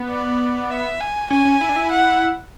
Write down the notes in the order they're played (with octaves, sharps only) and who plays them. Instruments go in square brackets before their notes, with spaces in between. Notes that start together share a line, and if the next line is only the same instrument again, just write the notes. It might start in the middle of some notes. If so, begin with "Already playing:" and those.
Already playing: [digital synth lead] B3
[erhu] D5
E5
G#5
[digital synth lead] C#4 [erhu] G#5
[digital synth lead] C#4
E4
D4
E4
[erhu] F#5